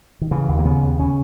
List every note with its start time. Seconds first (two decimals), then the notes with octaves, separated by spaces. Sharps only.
0.21 D#3
0.31 C#3 E3
0.49 D#2
0.59 A#3
0.65 C#3 B3
0.82 D#2
0.99 C#3 C#4